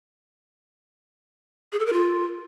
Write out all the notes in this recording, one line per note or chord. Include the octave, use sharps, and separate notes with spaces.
G#4
A4
A#4
F4